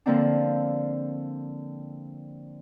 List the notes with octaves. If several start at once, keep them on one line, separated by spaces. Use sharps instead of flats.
D3 F3 A#3 C4 D4